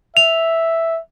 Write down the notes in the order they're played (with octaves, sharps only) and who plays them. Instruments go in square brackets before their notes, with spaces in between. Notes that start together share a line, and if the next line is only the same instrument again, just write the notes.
[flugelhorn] E5 [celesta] F7